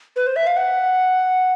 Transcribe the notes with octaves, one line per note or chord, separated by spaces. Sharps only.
B4
C5
E5
F5
F#5